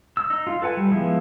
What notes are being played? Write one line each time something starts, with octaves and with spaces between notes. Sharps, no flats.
E6
D#4
F4
A4 B4 F#5 G#5
G3
F3 G#3 B3 E4